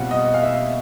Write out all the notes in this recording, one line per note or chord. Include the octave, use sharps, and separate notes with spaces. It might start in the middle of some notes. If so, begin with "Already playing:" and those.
Already playing: B2 G3 C4 F4 F#5
D#5
F5
E5